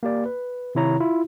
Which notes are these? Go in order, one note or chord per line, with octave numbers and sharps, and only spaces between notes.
A#3 G4 D5
B4
C3 D#3 E4 C#5 A#5
E4 F4